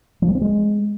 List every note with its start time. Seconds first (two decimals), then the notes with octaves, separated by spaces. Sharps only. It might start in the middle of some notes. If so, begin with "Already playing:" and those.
0.22 F3
0.28 G3
0.35 C4
0.41 G#3